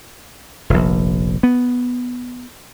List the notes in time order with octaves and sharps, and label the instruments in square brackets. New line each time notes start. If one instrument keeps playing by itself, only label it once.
[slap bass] F1 A#1
B3